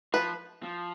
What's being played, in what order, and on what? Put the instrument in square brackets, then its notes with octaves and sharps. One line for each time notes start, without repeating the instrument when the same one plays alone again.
[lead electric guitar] F3 [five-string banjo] B4
[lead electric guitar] F3